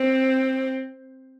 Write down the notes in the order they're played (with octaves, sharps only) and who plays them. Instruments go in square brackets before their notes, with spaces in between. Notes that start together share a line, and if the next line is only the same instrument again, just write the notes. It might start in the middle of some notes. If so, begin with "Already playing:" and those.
Already playing: [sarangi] C4